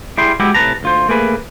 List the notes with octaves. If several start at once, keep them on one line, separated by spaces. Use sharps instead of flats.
G3 E4 G#4 G5 C6
G#3 B3 E4 F#4 G4
A2 C3 B4 A5 A#5
D2 F4 C5
A3 A#3 G#4 B4